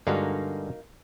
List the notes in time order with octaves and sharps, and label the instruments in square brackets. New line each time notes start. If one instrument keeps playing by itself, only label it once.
[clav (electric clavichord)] G2 D3 G#3 [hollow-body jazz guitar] A#3 D#4 F#4